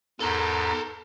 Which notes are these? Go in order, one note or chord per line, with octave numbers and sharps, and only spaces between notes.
E2 G#2 A4 A#4